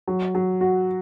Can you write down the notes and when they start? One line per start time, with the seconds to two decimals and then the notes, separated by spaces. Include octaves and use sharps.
0.08 F#3
0.35 F#3
0.61 F#4